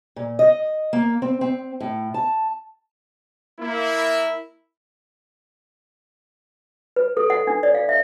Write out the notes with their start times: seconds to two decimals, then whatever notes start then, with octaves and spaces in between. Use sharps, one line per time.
0.16 A#2
0.39 D#5
0.93 A#3
1.22 C4
1.41 C4
1.81 A2
2.14 A5
3.60 A#3 E4
6.96 B4
7.17 A4
7.30 F#5
7.47 D4
7.63 D5
7.74 F5
7.89 E5